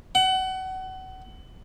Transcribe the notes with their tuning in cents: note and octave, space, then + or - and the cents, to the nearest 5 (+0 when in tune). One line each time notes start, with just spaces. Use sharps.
F#5 +30